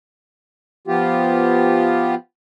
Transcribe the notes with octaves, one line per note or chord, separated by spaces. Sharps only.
F3 B3 F4 G4